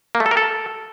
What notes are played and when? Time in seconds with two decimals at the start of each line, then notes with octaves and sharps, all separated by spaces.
0.15 A#3
0.20 A3
0.26 A4
0.31 A#4
0.37 A4